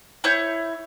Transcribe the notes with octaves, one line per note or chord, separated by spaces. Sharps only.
E4 C#5 G6